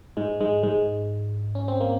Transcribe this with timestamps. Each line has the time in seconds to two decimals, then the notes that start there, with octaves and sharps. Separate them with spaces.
0.17 G#2 G#3
0.40 G#2 G#3
0.63 G#2 G#3
1.55 C#4
1.68 C4
1.80 A#3